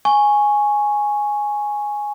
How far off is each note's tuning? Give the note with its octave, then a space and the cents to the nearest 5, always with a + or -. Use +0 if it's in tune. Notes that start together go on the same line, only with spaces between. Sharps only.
G#5 +0 C#6 -5